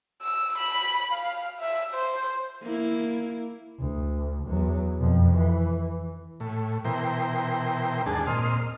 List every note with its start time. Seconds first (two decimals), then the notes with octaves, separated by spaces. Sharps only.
0.22 E6
0.58 B5
1.12 F5
1.60 E5
1.94 C5
2.63 A#3 E4
3.79 D2
4.47 E2 F#3
4.98 F2 B2
5.34 E3
6.40 A2
6.85 B2 E3 A#4 C5 G5
8.06 D#2 G#2 D4 G#4 A5
8.27 A#2 C4 D#5 C6 F6